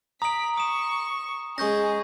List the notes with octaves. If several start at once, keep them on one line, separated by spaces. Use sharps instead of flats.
A#5 D#6 B6 D7 F#7
C#6 D#6 E7
G#3 C#4 G#4 C#6 G6 A#6